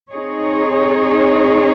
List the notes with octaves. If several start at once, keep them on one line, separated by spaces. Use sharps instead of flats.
C4 D#4 G#4 C#5